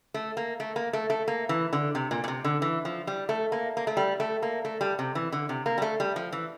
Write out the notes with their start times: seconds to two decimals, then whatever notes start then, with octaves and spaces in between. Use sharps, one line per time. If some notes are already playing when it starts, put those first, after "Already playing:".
0.14 A3
0.37 A#3
0.60 A3
0.76 A#3
0.93 A3
1.10 A3
1.28 A#3
1.49 E3
1.73 D3
1.95 C3
2.11 A#2
2.24 A#2
2.28 C3
2.45 D3
2.62 E3
2.85 F3
3.07 G3
3.29 A3
3.52 A#3
3.77 A#3
3.87 A3
3.97 G3
4.20 A3
4.43 A#3
4.65 A3
4.81 G3
4.99 C3
5.15 E3
5.32 D3
5.49 C3
5.66 A#3
5.78 G3
5.82 A3
6.00 G3
6.16 F3
6.32 E3